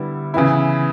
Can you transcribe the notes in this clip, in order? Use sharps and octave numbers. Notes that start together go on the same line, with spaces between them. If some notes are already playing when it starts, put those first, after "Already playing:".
Already playing: D3 G3 B3 E4
C#3 E3 B3 E4